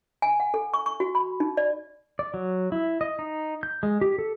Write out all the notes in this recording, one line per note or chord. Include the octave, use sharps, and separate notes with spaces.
G#5
F#5
A4
C#6
C#6
F#4
B5
D#4
D5
D5
F#3
E4
D#5
D#4
G6
G#3
G4
A4